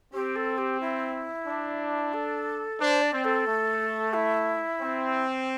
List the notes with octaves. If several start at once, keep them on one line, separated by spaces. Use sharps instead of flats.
C4 G4
A4
G4
E4
D4
A4
D4 C5
D5
C4
A4
A3
E4
C4